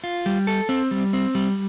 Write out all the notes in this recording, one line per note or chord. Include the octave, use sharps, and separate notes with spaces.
F4
G3
A4
C4
G3
C4
G3